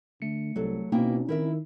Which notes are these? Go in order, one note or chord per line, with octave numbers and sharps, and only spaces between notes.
D3 A3 C#7
C2 F#3 A4
B2 A#3 C4 C#4 D#4 E4 G5
D#3 E4 A#4 E5